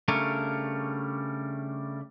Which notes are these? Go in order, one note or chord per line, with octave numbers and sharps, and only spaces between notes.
C#3 G3 A3 D4 A#4 C#5